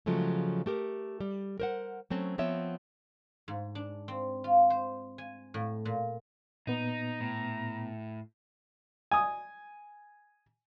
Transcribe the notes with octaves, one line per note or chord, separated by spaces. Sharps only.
C#3 F3 F#3 G#3 A3
A3 G4 A#4
G3
A#4 C5 F#5
F#3 A3 C4 C#4
F3 B3 C4 C#5 E5
G#2
D4
C4
F4
C5
G#5
A2
A#2
A#2 B3 D#4 A#5
A2
G#5 D#6